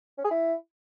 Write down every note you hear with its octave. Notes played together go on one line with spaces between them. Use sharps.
C#4
G#4
E4